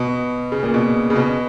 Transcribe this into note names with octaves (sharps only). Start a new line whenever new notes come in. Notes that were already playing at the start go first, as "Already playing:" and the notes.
Already playing: B2
C#3
A#2
B2
C#3
B2